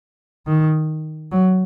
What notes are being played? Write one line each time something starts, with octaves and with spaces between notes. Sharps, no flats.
D#3
F#3